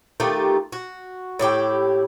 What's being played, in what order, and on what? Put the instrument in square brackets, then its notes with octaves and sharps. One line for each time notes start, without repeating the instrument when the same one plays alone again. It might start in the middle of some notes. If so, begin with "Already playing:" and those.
[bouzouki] D#3 A3 F4 G4
F#4
A2 E4 G4 G5